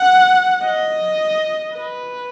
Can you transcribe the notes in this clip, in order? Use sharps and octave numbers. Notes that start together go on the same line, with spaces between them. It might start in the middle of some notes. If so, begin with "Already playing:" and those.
Already playing: F#5
D#5
B4